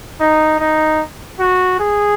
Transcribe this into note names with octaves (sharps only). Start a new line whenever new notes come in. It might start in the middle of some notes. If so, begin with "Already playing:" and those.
D#4
D#4
F#4
G#4